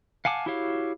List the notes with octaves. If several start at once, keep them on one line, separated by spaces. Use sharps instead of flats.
F5 F#5 G#5 A5 D6
E4 F#4 G4 C#5 F5